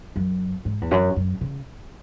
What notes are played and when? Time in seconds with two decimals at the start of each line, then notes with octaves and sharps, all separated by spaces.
0.16 F#2
0.65 G#2
0.81 E2
0.91 F#2
1.16 F#2
1.41 C#3